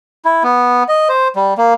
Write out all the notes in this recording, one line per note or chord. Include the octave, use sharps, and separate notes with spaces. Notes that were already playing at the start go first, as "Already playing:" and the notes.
E4
B3
D#5
C5
G3
A#3